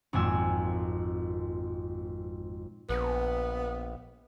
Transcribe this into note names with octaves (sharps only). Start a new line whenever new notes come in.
G#1 F2 A#2 G#5 E6
A#1 B3